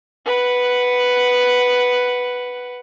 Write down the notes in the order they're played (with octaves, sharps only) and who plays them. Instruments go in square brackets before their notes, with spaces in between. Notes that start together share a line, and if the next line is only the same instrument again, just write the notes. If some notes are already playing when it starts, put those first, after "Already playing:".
[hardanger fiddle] B4 F#5